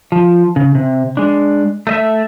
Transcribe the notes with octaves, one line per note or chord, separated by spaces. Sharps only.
F3
C#3
C3
G#3 D4
A3 D#5 E5